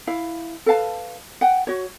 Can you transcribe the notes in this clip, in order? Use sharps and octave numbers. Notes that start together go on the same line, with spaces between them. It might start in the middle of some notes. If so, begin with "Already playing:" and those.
E4 F5
A4 B4 F5 A5
F#5 G5
F#4 C#5